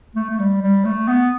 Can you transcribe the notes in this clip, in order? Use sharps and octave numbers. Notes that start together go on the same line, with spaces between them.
A3
A3
G3
G3
A3
B3